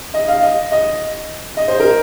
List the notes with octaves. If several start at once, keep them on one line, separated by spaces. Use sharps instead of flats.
D#5
F5
D#5
D#5
D#5
C5
A#4